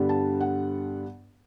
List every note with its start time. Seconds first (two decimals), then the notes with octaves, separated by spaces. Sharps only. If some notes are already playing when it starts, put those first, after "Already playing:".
Already playing: G2 D3 G3 B3 D4
0.09 A5
0.41 F#5